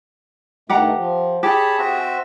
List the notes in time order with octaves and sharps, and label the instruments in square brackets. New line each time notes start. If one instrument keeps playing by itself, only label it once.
[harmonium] G2 D#3 A3 [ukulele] G4 F#5 A#5
[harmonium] F3
[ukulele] G4 [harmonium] G#4 [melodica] C#5 A5 B5
[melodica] C4 F#4 E5